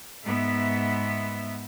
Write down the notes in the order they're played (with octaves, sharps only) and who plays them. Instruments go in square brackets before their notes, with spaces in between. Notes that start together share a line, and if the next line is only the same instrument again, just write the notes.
[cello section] G#2 B3 E5